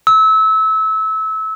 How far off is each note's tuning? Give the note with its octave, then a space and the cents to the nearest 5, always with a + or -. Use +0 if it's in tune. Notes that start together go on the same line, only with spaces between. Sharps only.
E6 -25